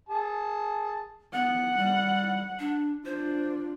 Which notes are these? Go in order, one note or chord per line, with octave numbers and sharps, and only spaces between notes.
G#4 A5
B3 F#5
G3
D4
D4 F4 C5